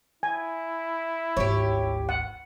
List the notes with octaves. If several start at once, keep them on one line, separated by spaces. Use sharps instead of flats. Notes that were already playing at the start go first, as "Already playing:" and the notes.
E4 G#5
G#1 D2 G4 C#5
F#5